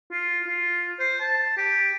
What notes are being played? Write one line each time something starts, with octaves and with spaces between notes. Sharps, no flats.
F4
F4
C5
A5
G4